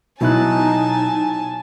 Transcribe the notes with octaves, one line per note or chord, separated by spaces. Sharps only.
B2 F#3 D#4 E4 G#5 A5 F#6